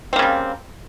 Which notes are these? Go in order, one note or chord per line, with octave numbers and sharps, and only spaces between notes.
C#3 G3 A#3 C4